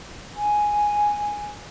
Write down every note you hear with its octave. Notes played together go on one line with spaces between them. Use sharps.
G#5